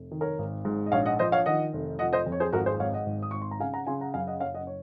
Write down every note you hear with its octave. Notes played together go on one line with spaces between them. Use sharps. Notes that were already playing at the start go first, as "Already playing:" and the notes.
Already playing: F1
D#3
A#4 C#5
G#1
G#2
D#5
A#1 C#5 F5
D#5 F#5
F3 C5 D#5
C#5 F5
D#3 D#5 F#5
F1
F3 D#5 F#5
C5 D#5
F2
C#5
G#4 C5
G#1 F#4 A#4
G#4 C5
G#2 C#5 F5
D#5 F#5
G#1
D#6
G#1 C#6
C6
A#5
C#3 F5 G#5
F#5 A#5
C#3 G#5 C6
F#5 A#5
F#2 F5 G#5
D#5 F#5
F#1 C#5 F5
D#5 F#5
C#5